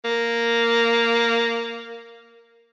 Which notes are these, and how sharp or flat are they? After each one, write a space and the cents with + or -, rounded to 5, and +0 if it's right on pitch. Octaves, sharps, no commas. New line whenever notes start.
A#3 -5